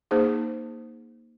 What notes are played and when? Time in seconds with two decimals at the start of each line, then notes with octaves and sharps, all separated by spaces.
0.11 A#3 D#4 G#4 C5